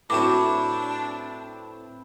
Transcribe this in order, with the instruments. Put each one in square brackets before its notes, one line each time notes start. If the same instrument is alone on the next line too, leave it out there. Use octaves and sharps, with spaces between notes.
[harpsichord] A2 E4 C#5 [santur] C4 B4 [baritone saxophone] D4 [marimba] F#4 D6